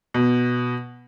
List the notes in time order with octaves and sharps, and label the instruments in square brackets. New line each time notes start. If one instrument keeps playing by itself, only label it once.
[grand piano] B2